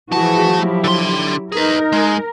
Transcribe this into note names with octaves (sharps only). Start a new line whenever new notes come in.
E3 F3 A3 F#4 G#4 A5
F#3 E4 G4
D3 C6
D#4 G#4 A#4 B4
G#3